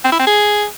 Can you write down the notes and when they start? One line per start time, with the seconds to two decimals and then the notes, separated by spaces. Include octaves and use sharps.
0.04 C4
0.12 E4
0.19 C4
0.27 G#4